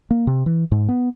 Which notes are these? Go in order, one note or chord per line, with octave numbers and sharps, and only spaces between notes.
A#3
C3
E3
G#2
B3